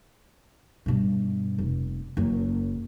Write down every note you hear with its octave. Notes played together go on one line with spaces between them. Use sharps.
G2 B2
F1
F#1 F#2